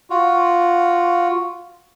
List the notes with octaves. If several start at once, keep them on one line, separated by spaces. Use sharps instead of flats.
F4 F#4